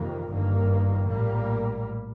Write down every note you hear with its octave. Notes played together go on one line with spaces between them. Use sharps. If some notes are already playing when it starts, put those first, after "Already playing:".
Already playing: F2 C3 D#3 A#3
G1 G2 D#3 A#3
A#1 A2 G3 A#3